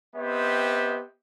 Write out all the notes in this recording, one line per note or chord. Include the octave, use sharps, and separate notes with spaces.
B3 C4 G4 C5 D#5 E5